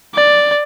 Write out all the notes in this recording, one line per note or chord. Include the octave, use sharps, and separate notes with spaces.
D5